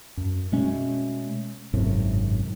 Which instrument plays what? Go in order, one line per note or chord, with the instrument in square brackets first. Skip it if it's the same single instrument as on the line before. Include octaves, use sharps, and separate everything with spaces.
[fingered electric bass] F#2
B2 G#3 A3 C#4
G#1 F#2 A2 C3